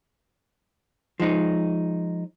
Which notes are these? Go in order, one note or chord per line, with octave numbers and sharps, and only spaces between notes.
F3 G#3 D#4